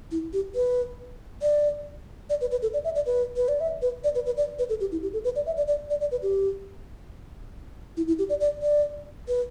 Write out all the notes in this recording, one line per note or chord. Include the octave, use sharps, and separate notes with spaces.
E4
G4
B4
D5
D5
B4
B4
A4
D5
E5
D5
B4
B4
D5
E5
B4
D5
B4
B4
D5
B4
A4
G4
E4
G4
A4
B4
D5
E5
D5
D5
D5
D5
B4
G4
E4
E4
G4
D5
D5
D5
B4